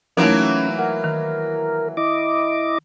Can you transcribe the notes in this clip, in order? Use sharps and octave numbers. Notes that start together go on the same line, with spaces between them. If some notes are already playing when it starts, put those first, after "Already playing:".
E3 F#3 A3 A#3 C#4 D#4
A#4 F#5
D#3
E4 D#5 D6